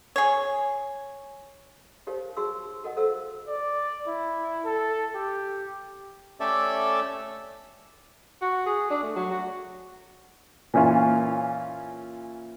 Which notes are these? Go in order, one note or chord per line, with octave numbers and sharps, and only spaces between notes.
G#4 C#5
D#4 G4 A#4 C5 C#5 F5
D#4 F#4 G#4 C6 C#6 E6
F#4 A#4 D#5 F#5
A4 C5 F5 E6
D5
E4
A4
G4
A3 C#4 G4 A4 D5 E5
F#4
G#4
D4
A3
F#3
F#4
A#2 E3 C#4 E4 F4